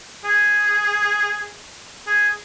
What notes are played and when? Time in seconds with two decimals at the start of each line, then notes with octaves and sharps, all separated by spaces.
0.24 G#4
2.07 G#4